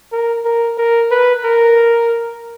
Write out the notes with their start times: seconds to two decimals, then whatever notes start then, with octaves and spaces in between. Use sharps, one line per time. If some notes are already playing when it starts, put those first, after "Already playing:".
0.12 A#4
0.45 A#4
0.78 A#4
1.11 B4
1.44 A#4